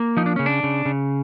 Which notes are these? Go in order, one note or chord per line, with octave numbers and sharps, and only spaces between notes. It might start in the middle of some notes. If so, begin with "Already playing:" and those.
Already playing: A#3
F3 D#4
D4
C#3 C#4
D4
C#3
C#3